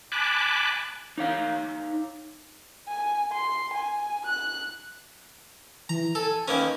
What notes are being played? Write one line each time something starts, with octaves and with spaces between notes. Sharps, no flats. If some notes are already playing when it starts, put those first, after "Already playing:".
G#5 A5 B5 D6 F#6
D#4 C#5 F5
G#5
C6
G#5
F#6
E3 A#5
A4 G#5
D#3 A#3 C#4 B4